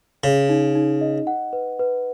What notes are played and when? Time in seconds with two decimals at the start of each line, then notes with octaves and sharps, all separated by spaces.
0.23 C#3 G#4
0.49 D#4
0.75 D#4
1.01 D#5
1.27 F#5
1.53 B4
1.79 B4